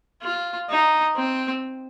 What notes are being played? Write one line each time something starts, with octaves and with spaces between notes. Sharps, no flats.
F4
D#4
C4